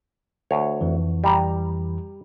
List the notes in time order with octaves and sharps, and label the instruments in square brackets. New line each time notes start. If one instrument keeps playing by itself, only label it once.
[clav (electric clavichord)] D2 C#5
[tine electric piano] F2 E3
[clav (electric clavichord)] G3 A#5